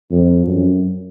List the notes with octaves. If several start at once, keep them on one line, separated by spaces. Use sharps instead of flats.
F2
F#2